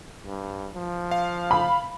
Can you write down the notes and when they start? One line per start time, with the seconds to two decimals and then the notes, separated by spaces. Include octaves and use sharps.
0.25 G2
0.75 F3
1.11 F5
1.51 B5